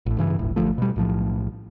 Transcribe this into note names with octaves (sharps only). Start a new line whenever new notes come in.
A1 A2
G2 C#3 E3
D1 G1 A2
G#1 D3 F3 A3
B2 G3
B1 A2 F3